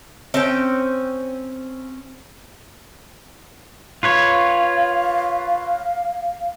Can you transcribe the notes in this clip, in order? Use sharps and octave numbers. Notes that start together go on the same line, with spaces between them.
C4 C#4 G5
F4 B4 C#5 F5